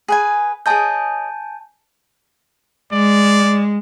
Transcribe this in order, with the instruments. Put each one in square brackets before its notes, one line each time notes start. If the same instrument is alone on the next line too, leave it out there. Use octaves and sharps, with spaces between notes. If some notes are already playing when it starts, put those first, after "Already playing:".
[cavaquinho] G#4 B4 G#5
[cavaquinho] G#4 C#5 D#5 [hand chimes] G#5 A5 G6
[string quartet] G#3 [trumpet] D5